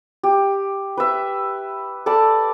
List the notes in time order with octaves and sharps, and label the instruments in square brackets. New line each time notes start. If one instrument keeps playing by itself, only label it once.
[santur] G4
B4 E5
A4 D5 A5 B5